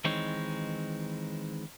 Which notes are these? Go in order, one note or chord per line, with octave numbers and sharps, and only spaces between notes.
D#3 E3 G#3 C4 D#4 C#5